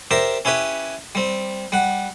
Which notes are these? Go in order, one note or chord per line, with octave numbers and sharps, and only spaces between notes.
G4 A#4 C5 D5 E5
C#4 E4 G4 B4 C#5
G3 C4
G3 F#5